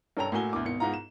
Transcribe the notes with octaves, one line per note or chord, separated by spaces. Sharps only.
G2 C#4 A4 G5 A#5 F7
A2 A#3 E4 F#4 G#5 G7
D2 B2 D6
G#1 B2 C#7
G#2 B3 D#4 F4 A#5
E7